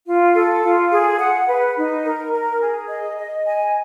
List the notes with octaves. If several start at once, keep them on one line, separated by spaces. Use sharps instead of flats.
F4
A4
F4
G#4
F#5
B4
D#4
A#4
A#4
G#4
D#5
D#5
G#5